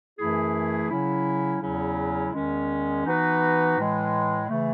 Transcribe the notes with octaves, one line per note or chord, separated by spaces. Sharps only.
F#2 E3 A3 E4 G#4
C#3 F#3 C#4 E4
E2 C#3 F#3 C#4 E4
E2 D#3 G#3 C#4
E3 B3 D#4 F#4 B4
A2 E3 G#3
C#3 E3 A3